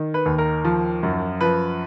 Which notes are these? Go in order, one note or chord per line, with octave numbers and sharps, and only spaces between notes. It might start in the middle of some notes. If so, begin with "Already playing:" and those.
Already playing: D#3
B4
D#2
A#4
F3
F#2
F3 B4